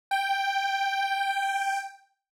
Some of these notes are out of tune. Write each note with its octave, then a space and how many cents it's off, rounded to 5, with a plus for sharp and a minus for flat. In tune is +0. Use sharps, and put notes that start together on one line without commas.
G5 +5